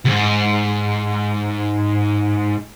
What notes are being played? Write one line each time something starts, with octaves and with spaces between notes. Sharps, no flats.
C#2 G#2